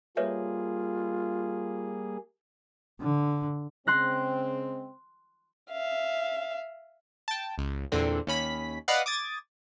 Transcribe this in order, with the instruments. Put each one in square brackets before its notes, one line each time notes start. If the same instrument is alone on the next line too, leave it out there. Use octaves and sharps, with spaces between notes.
[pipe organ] G3 A#3 G#4 [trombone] F4 [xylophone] B4 C#5 E5
[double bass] D3
[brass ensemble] C#3 G#3 C4 [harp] C6 F#6 A#6
[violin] E5 F5
[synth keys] G5 A5
C#2
E2 A#2 D3 C4
D#2 C#4 B5 B6
B4 D5 D#5 F5 F#5
D6 D#6 G#6 A6